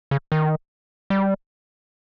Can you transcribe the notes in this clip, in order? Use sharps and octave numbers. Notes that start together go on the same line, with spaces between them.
C#3
D#3
G3